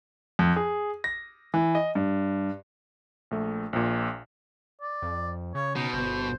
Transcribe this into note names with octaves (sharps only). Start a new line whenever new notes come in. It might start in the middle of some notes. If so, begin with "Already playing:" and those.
F2
G#4
A#6
E3
D#5
G2
A#1 A3
A#1 A#2
D5
F2
C#3 C#5
B2 D#4
G1 C5